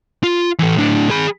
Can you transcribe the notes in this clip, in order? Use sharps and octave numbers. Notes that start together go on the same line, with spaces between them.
F4
E3 A4
A2 D4
G#4 B5